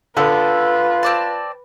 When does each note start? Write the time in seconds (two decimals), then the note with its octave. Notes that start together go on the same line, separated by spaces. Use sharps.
0.17 D3 B3 F4 A4 B4
1.03 C4 D5 A5